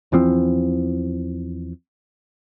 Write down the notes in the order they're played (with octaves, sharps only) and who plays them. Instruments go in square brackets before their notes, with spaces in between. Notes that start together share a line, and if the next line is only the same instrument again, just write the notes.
[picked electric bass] E2 E3 F3 C4